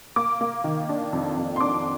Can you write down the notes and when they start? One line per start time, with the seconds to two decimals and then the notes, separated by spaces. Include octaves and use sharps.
0.16 A#3 D6
0.41 A#3
0.64 D#3
0.89 D4
1.13 F2
1.37 F2
1.56 C6
1.60 D4 D6